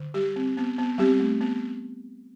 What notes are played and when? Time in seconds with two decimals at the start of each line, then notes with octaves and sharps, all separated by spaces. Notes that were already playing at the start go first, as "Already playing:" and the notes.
Already playing: D3
0.14 G3 G4
0.36 C4
0.57 B3
0.78 B3
0.98 G3 C4 G4
1.20 A3
1.41 B3